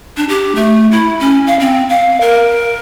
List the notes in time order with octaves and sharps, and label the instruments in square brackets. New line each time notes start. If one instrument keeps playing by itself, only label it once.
[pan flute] D4
G4
A3
E4
C#4
F5
C4
F5
A#4